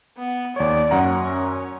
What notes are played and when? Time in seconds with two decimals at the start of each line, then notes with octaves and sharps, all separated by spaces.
0.17 B3
0.56 D#2 C#5 D5
0.91 F#2 C#4 F#5 A#5